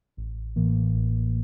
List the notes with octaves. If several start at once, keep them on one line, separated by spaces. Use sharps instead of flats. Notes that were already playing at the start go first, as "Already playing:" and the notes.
A1
A2 E3 A#3
A1